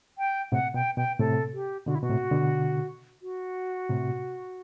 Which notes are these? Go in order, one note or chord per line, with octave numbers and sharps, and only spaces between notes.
G5
A2 C3 F#5
B2 G5
B2 G5
A2 C3 A4
G4
B2 D3 F#4
E4
B2 F#4
A2 C3
B2 D3
F#4
A2 C3